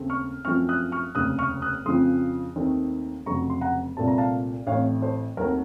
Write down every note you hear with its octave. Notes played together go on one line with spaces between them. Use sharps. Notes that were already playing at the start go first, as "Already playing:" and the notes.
Already playing: D#2 C#3 A3 C4
C#6 F6
F#2 F3 A3 C4 C#6 F6
D#6 F#6
C#6 F6
F1 D#2 C#3 D#6 F#6
C#6 F6
D#6 F#6
F2 C#3 F3 C4 C6 D#6
D#2 D#3 A3 C4
F1 F2 C#3 F#3 A#5 C#6
C6
F#5 A#5
C2 A#2 A3 C4 A5
A#5
F5 A5
A1 A2 A3 C4 C#5 F5
A4 C5
D#2 D#3 F#3 A3 C4 A#4